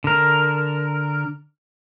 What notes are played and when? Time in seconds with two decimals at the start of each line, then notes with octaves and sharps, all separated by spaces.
0.04 D3 A#4